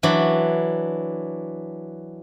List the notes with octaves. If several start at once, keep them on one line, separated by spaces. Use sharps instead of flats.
E3 F#3 D4